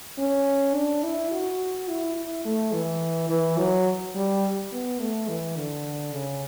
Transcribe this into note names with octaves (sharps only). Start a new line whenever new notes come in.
C#4
D4
E4
F#4
E4
E4
A3
E3
E3
F#3
G3
B3
A3
E3
D3
C#3